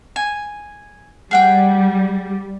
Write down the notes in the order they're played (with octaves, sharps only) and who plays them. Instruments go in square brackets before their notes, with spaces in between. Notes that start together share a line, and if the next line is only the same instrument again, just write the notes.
[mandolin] G#5
[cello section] G3 [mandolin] G#4 F#5 G5